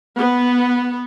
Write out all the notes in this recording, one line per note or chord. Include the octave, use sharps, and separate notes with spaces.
B3